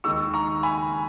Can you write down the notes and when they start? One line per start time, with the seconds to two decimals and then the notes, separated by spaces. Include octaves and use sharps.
0.04 D#2 D#3 G#3 D#4 C#6 E6
0.34 A#5 C#6
0.63 G#5 B5